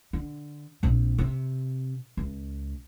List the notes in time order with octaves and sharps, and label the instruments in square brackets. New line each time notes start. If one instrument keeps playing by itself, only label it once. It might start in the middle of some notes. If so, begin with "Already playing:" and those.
[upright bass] D3
A#1 C4
C3
C#2